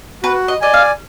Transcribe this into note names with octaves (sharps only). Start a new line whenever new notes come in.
F#4 B4
D#5
D5 D#5 G#5
F5